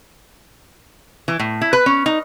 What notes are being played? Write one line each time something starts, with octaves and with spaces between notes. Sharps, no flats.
E3
A2
E4
B4
C#4
D#4